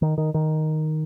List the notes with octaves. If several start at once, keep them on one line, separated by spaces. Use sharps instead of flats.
D#3
D#3
D#3